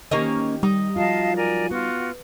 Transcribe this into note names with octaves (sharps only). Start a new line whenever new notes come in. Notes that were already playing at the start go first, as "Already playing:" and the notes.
D#3 A#3 C#4 G4 D#5
G3 D#4
F3 F#3 F4 D#5 F5 A5
A#4 D5 G#5
B3 F4 F#4